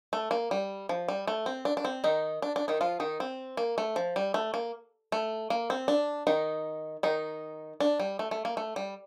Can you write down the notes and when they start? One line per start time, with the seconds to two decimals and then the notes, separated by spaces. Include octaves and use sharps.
0.13 A3
0.31 A#3
0.51 G3
0.89 F3
1.08 G3
1.27 A3
1.46 C4
1.65 D4
1.77 D4
1.85 C4
2.04 D#3 D#4
2.42 D4
2.56 D4
2.68 D#3 D#4
2.81 F3 F4
3.00 D#3 D#4
3.20 C4
3.57 A#3
3.78 A3
3.96 F3
4.16 G3
4.34 A3
4.54 A#3
5.12 A3
5.50 A#3
5.70 C4
5.88 D4
6.27 D#3 D#4
7.03 D#3 D#4
7.80 D4
7.99 G3
8.19 A3
8.31 A3
8.45 A#3
8.57 A3
8.76 G3